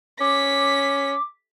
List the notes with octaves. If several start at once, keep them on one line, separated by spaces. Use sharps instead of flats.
C#4 D6 B6